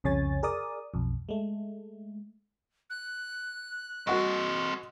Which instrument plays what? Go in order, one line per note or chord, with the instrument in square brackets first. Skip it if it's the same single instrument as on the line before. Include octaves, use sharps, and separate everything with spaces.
[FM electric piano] C2 F2 C#3 C#5 G#5 A6
G#4 A#4 D5 D#6
B1 F2
G#3 A3
[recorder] F#6
[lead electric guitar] C4 D#5 [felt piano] F#4 F#5 C#6